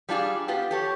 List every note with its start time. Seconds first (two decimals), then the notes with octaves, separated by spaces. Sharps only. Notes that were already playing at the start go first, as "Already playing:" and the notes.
0.09 G3 D4 F4 F#4 G#4
0.48 B3 F4 G4
0.71 G4 A4 C#5